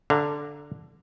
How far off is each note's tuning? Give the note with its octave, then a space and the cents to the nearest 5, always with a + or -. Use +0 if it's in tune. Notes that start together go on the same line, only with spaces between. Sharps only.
D3 +0 F5 -45 A#5 +0